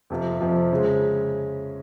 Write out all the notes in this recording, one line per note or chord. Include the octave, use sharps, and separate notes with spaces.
F2 C3 F3
F2 C3 F3
C#3 G#3